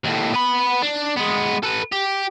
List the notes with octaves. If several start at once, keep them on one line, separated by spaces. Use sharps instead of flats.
D#2 A2
B3 B5
D4
G#3 B3
A4 B4
G4